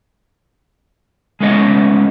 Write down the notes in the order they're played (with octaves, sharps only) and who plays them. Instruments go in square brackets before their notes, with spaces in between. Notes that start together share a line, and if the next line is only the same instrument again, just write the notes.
[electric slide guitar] G#3 A3 B3 C#4 D#5